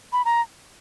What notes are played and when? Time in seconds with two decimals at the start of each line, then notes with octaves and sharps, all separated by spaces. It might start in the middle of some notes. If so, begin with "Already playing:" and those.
0.13 B5
0.25 A#5